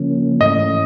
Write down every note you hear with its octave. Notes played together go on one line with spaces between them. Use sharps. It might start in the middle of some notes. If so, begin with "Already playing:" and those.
Already playing: C#3 F3 A#3 C#4
G#2 E3 A3 C#4 D#5